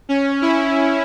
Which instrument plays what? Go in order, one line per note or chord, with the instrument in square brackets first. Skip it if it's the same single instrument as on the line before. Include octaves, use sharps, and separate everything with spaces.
[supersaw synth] C#4
E4